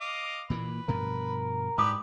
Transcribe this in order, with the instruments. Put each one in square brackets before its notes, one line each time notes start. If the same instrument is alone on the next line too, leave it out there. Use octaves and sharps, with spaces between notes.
[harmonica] D#5 F5 D6
[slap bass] A#2 E3 A#3 [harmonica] B4
[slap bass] G2 B2 F3 [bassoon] A#4
[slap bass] G#2 [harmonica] D4 G4 B4 [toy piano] D6 D#6